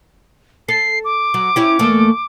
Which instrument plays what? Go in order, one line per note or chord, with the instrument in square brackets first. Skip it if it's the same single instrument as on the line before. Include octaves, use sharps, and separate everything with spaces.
[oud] A4 [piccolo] C7
[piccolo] D6
[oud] F#3
C#4 E4 G4
E2 A3 A#3